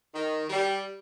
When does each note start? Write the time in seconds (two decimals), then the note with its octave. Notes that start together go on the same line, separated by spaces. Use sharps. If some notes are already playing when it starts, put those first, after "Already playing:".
0.14 D#3
0.50 G3